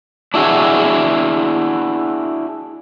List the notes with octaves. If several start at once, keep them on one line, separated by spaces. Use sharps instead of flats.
D4 E4 F#4 G#4